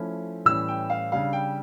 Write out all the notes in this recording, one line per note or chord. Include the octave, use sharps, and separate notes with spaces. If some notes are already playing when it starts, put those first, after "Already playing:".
Already playing: F3 A3 C#4 E4
A2 E3 G3 C#4 E6
G5
F5
C#3 G3 D4 F5
G5